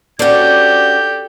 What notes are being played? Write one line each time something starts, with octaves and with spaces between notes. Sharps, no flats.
C#4 D4 F#4 G4 A4 C5 D5 G6